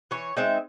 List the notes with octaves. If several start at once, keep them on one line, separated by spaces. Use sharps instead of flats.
E3 C#5
G#3 C4 D#4 E5